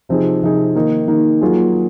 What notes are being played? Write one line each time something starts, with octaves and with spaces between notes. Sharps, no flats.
C3 F3 C4 D#4 G#4
C3 F3 C4 D#4 G#4
D#3 A#3 D#4
D#3 A#3 D#4
F#3 A#3 F4 G#4